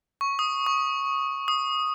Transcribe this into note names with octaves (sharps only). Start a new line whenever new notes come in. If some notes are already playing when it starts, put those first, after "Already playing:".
C#6
D#6
C#6
D#6